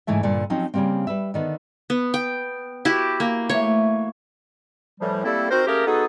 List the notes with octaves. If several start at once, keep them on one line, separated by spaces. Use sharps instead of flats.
G#2 C#3 E3 A3 E5
G2 A#2 D3
F3 F#3 C4 C#4 D#4
C#3 E3 G3 A#3 C4
G3 B4 E5
D3 D#3 B3
B3
G5
E4 F#4 G4
A#3
E3 A3 C#5
A2 E3 F3 G3
G3 A3 A#3 C4 E4 A4
C4 D#4 F#4 A#4 C5
A3 A#3 C#4 G4 G#4 A#4
B3 D#4 F#4 G#4 A4